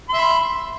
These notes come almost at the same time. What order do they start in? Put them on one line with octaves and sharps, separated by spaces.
C6 E5 B5